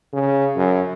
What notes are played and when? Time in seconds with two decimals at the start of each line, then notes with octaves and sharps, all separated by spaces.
0.13 C#3
0.56 F#2